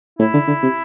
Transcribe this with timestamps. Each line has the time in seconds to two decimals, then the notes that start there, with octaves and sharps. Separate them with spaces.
0.19 A2 E4
0.33 D3
0.48 D3
0.63 C3